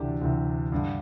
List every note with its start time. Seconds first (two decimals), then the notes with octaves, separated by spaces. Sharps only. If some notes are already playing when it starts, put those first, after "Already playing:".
Already playing: D2 C3 E3 D4 G4
0.21 D2 C3 E3
0.72 G2 D3